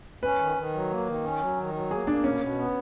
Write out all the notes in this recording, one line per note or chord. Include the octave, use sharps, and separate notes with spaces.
C#4 B4
D#3
D#3
F#3
A#3
D#3
C#4
F#3
D#3
F#3
A#3 G#4
A#3 D4
B2 C#4
B2
B3